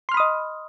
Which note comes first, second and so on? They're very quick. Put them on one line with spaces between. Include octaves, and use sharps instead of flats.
C6 F6 B5 D#6 D#5